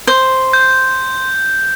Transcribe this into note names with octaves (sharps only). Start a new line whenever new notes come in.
C5
G6